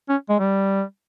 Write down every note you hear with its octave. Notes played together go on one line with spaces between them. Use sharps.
C#4
G#3
G3